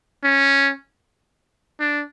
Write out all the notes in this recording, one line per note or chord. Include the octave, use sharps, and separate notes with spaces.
C#4
D4